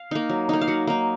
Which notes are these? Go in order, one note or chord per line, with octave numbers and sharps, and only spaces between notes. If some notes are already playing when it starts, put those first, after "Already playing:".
Already playing: F5
A#3 D#4
F#3
A#3 D#4
F5
F#3 F#5
A#3 D#4